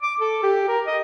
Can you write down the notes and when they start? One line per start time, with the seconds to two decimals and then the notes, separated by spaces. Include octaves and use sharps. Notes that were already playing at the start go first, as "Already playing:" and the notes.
0.02 D6
0.20 A4
0.43 G4
0.68 A#4
0.87 D#5